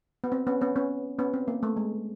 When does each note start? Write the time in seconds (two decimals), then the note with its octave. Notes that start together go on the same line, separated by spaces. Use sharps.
0.24 B3
0.32 C4
0.47 B3 C#4
0.61 B3 C#4
0.76 B3 C#4
1.19 B3 C#4
1.34 C4
1.48 A#3
1.63 A3
1.77 G#3